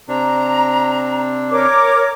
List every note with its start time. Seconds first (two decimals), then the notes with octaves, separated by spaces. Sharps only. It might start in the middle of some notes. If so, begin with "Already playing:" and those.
0.08 C3 C4 D4 A#5
1.51 A#4 C#5 D6